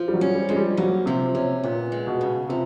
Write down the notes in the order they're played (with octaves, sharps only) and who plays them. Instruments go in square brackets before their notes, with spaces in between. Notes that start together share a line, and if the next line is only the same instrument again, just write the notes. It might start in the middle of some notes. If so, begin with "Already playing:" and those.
Already playing: [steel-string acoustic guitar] F3
[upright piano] G3
F#3
[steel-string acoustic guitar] C#4
[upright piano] G3
[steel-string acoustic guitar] F3 [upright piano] G#3
[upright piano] G3
[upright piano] F#3 [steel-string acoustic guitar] A#3
[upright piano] C3 [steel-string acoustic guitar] F3
[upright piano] C3 [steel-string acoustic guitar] C#4
[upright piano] A#2 [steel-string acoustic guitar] B3
[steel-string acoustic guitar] G#3
[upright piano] B2
[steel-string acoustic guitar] C#3
[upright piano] C3 [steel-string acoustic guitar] F3